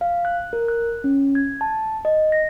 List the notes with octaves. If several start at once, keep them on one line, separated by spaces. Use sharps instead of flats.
F5
F#6
A#4
F#6
C#4
G#6
A5
D#5
A#6